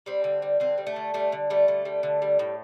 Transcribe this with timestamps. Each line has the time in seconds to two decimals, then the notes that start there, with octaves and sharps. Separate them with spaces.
0.06 G3 C4
0.24 D3
0.42 G3
0.60 D3 C4
0.78 G3
0.87 A3
0.96 D3
1.14 G3 A3
1.32 D3
1.50 G3 A3
1.68 D3
1.85 G3
2.03 D3
2.22 G3
2.39 A2